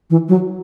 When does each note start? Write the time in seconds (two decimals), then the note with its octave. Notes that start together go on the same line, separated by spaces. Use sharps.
0.10 E3
0.29 F#3